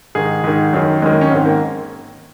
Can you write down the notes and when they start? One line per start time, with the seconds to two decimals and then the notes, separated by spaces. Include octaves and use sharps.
0.15 G#2 D#3 G#4
0.44 G#2 D#3
0.73 F#2 D#3
1.02 F#2 D#3 G#3
1.12 A#3
1.21 C#4
1.31 G#2 D#3 C4
1.46 A#3